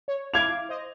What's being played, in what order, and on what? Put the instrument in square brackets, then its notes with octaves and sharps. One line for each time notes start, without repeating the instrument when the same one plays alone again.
[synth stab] C#5
[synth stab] E4 F5 D6 [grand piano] G#6 F7
[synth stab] C5 D#5